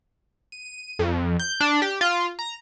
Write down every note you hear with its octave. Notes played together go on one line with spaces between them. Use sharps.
D#7
F2
G6
D4
G4
F4
A#5